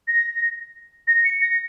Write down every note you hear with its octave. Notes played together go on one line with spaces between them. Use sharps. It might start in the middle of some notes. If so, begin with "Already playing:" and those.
A#6
A#6
C#7
A#6